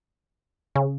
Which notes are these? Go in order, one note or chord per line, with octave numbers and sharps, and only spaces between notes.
C#3